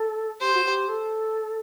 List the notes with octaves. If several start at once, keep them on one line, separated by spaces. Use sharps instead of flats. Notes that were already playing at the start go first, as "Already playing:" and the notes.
Already playing: A4
G4 C5
F#4
G4
A4